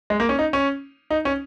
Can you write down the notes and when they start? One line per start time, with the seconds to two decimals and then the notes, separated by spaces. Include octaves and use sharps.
0.10 G#3
0.20 A#3
0.29 C#4
0.39 D#4
0.53 C#4
1.10 D#4
1.25 C#4